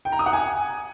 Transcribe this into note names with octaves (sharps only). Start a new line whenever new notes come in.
G5
A#5
D#6
F#5
G#5